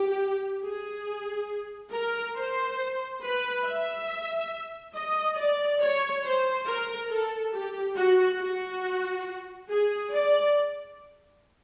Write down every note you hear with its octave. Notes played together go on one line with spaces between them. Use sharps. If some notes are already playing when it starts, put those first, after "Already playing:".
Already playing: G4
G#4
A#4
C5
B4
E5
D#5
D5
C#5
C5
A#4
A4
G4
F#4
F#4
G#4
D5